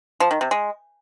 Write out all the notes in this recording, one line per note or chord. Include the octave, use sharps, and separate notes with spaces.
F3
D#3
C3
G#3